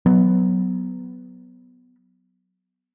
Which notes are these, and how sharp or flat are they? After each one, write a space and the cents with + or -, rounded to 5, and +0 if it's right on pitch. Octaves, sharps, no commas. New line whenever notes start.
F#3 +0 B3 +10